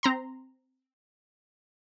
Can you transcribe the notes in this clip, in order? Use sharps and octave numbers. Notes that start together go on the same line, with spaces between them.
C4 A#5 C6